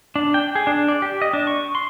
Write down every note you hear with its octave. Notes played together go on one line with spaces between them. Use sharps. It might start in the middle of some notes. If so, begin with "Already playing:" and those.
D4
G5
G#4
D4
D5
G4
D#5
D4
C#6
C6